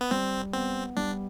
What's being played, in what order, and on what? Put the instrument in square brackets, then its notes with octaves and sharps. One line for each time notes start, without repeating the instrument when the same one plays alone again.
[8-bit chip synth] B3
[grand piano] G3 [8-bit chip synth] C4
[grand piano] B3 [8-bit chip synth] C4
[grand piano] G3 [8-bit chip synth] D4